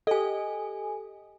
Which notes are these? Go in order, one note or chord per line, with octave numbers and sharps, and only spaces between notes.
G4 A4 D#5 G#5